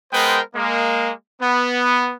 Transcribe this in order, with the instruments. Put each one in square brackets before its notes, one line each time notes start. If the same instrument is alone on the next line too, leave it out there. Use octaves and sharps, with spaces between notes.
[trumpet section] G#3 B3 A#4 C5 G5
G#3 A#3
B3